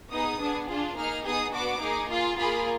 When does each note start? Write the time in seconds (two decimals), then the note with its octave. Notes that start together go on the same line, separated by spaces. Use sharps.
0.12 B3 D#4 G#4 D#6
0.40 B3 D4 G#4
0.69 D4 F4 G#4
0.97 A#3 D#4 G#4 F6
1.25 B3 D#4 G#4 D#6
1.54 B3 D4 F#4 D6
1.82 A#3 D#4 G#4
2.10 A#3 F4 G#4
2.38 A#3 F4 G#4 B5